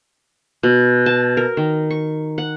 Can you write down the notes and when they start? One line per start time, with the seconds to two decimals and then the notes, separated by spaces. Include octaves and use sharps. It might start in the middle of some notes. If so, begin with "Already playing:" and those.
0.63 B2
1.06 A5
1.37 A#4
1.57 D#3
1.91 C#6
2.38 F#5